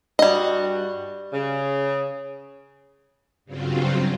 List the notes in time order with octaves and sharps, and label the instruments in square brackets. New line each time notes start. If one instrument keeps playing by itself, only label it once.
[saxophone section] G2 F#4 [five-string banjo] G3 D#5
[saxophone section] C#3
[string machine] G2 C#3 F#3 C4 F4